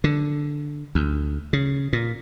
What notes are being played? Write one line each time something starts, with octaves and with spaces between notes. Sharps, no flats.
D3
D2
C#3
A#2